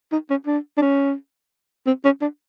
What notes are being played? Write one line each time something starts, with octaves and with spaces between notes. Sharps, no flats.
D#4
C#4
D4
D4
C#4
C4
C#4
D4